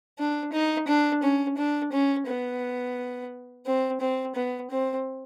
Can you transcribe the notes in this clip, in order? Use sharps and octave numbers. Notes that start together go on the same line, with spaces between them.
D4
D#4
D4
C#4
D4
C#4
B3
C4
C4
B3
C4